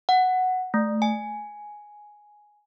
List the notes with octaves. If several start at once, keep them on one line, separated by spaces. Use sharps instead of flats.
F#5
A3
G#5